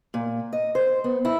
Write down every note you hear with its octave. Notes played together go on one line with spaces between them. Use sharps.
A#2
D#5
C5
B3
E4